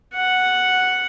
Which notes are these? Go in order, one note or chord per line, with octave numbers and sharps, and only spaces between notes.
F#5